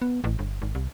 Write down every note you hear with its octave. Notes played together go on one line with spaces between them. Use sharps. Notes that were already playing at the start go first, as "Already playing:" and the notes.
B3
A1
G1
G#1
C2